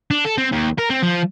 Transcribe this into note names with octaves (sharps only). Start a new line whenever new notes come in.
D4
A4
C4
D#2
A#4
C4
F3